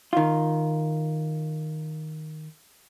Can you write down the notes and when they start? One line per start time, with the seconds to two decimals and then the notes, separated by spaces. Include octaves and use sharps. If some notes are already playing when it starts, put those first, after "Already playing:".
0.13 D#3 F4